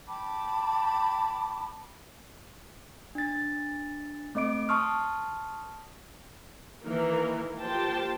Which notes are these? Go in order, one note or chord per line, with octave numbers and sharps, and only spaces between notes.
G5 A5 B5 D6
D4 A6
A3 C4 D#5 D6 D7
A5 C6 C#6 D#6 F6
D#3 E3 A#3 A#4
F3 A#3 G4 C5 G5 A5